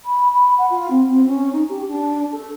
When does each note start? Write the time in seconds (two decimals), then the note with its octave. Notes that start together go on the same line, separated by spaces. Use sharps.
0.05 B5
0.31 B5
0.58 F#5
0.70 F4
0.90 C4
1.08 C4
1.27 C#4
1.53 D#4
1.69 G4
1.88 D4
2.32 A4